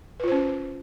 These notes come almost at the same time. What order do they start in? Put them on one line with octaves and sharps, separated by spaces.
B4 F4 C5 C#4